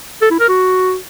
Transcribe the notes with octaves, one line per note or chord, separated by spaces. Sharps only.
A4
E4
A#4
F#4